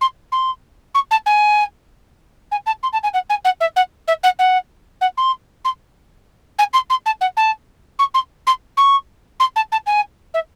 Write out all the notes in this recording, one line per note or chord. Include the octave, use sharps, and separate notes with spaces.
C6
C6
C#6
A5
G#5
G#5
A5
C6
A5
G#5
F#5
G#5
F#5
E5
F#5
E5
F#5
F#5
F#5
C6
C6
G#5
C6
C6
A5
F#5
A5
C#6
C6
C6
C#6
C6
A5
A5
G#5
E5